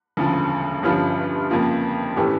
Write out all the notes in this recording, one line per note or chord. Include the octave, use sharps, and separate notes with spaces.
E1 D2 C#3 F3
G1 G2 F3 C#4 F4
F2 C#3 F3 A#3
A2 E3 A3 C#4 G4